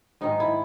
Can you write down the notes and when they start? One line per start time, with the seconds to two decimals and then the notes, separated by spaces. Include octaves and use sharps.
0.21 G#2 D#3 G#3 D#4
0.40 E4